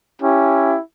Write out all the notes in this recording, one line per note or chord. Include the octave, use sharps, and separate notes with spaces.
C#4 E4 G4